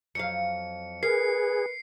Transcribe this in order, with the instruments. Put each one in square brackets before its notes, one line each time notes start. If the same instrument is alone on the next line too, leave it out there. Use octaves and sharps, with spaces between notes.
[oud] F2 F#3 F5 [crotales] C#7
[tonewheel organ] G#4 [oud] A#4 [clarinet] B4 [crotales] C7